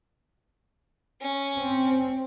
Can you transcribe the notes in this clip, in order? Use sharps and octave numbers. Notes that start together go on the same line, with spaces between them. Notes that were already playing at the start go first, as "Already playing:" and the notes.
C#4
C4